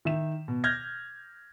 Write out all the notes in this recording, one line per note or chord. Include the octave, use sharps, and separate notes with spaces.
D#3 E5 E7
B2
F6 G6 G#6 A#6